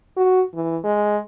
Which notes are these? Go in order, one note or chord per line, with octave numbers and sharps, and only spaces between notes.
F#4
E3
G#3